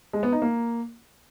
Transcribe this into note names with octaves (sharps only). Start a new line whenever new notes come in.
G#3
B3
D#4
A#3